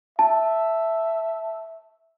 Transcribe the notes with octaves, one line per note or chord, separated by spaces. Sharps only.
E5 A5